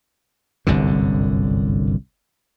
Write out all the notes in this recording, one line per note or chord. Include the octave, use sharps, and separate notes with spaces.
G1 C2 F#2 D3